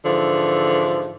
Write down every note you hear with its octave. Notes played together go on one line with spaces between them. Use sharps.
G#2 D3 E3 F3